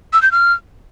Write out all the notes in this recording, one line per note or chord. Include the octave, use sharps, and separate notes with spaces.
E6
G6
F6